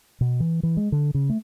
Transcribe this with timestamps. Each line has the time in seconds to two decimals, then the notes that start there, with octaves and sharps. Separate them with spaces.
0.21 B2
0.40 E3
0.63 E3
0.77 G#3
0.92 D3
1.14 C#3
1.30 A3